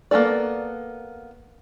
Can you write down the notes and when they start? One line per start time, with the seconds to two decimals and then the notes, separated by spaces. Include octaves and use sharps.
0.11 A#3 B3 C#4 A4 D5